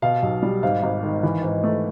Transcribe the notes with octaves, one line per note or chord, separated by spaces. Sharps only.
B2 F5
B1
G3
G#2 F5
G#1
D#3
E3
G#2
A3